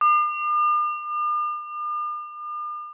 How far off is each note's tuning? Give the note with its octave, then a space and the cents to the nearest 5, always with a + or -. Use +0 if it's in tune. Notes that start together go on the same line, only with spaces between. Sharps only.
D6 +45